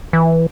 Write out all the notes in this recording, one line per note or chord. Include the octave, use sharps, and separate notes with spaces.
E3